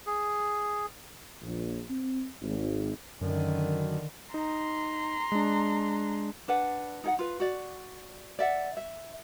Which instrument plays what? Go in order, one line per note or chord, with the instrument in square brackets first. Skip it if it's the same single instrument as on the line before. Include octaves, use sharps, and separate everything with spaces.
[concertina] G#4
[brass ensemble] A#1
C4
G#1
[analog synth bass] F#2 [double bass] D3 D#3
[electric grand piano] D#4 [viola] A#5 C6
[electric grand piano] G#3 D4
[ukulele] D4 B4 F#5
D#4 A4 F#5
F4 B4
F#4 D5
D5 E5 F#5
E5